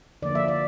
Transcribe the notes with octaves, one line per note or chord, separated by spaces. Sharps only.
D3 F3 A#3 D4 D5
E5
D5